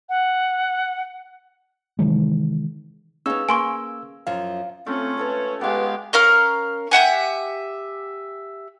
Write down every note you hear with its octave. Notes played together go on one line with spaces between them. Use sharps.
F#5
C3 D#3 E3 G#3
B3 C#4 D#4 G#4 F5 E6
A#3 G#5 C6 C#6
F#2 F3 F5
A3 C4 C#4 F4
A4 B4 C#5
G#3 B3 G4 B4 F5
C#4 A#4 F5 F6
G4 E5 F#5 G#5